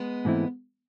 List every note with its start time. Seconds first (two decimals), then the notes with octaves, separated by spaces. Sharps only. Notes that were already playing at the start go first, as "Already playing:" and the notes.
Already playing: G#3 B3
0.25 G#2 E3 A3 C4 E4